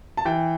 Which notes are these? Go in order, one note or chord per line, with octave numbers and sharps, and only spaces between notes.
A5
E3 G5